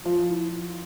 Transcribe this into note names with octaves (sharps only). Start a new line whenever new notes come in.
F3 F4
F4
E4